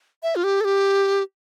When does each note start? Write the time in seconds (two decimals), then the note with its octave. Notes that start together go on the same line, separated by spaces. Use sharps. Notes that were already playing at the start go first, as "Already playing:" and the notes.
0.23 E5
0.36 F4
0.44 G4
0.61 A4
0.65 G4